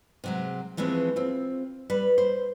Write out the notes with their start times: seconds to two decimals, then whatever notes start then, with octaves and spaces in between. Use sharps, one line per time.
0.24 C3 F#3 G#3
0.77 E3 F3 G#3 A3 C4
1.16 C4 F4
1.90 G3 B4
2.18 C5